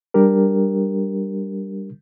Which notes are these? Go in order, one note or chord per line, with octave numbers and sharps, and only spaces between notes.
G3 D4 G4 A#4